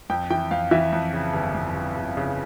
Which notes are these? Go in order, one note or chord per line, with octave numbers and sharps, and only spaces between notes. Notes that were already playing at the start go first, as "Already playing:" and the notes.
F2 G5
E3 G5
F2 F5
E3 E5
F2
C#3
G1
F2
G1
G1
C#3